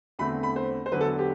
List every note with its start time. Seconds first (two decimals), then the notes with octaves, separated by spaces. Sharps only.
0.19 E2 D3 A3 C4 B5
0.43 B5
0.56 C5
0.86 C5
0.92 E2 D3 F#3 B4
1.01 A4
1.19 G4